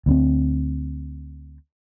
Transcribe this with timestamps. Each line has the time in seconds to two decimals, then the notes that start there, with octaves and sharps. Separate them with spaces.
0.06 D2 B3 C4